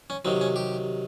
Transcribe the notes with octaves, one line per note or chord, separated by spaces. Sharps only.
C#4
C3 D#3 F#3 C4
C#4
G4